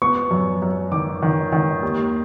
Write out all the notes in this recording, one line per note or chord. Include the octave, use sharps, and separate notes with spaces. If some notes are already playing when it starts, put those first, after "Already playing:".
B3 C#6
F#2
F#2
D#3 D6
D#3
D#3
D#2